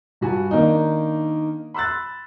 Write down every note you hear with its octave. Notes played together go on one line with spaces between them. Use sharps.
G2 F#4 G#5 A5
D#3 A#3 D4 D#4
B5 C6 E6 F#6 A6